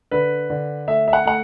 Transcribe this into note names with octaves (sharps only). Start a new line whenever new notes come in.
D3 B4
D3
A3 E5
E5
F#5
A3 F#5